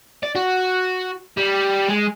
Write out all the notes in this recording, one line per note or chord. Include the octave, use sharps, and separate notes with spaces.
D5
F#4
G3
G#3